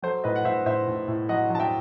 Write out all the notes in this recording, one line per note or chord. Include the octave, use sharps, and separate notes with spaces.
F#3 A4 C5
A2 B4 D#5
F#5
A2 C5 E5
A2 C5 E5
A2
A2
F#3 D#5 F#5
F#3 A5
E5 G5